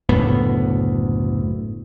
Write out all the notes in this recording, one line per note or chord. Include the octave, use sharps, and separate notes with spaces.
F#1 D2 A2 B3